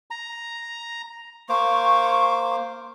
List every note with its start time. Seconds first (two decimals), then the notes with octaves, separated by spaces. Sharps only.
0.11 A#5
1.49 A#3 C5 C#6 D6